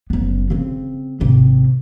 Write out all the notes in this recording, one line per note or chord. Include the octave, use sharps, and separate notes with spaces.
F#1 B3
C#3 C4
G#1 C3